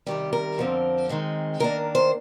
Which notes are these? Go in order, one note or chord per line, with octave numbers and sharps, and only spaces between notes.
C3 D#3 G3 G4
A#4
F2 D3 F3 C4
D#3 G#3 C4
D#3 A#3 D4 A#4
C5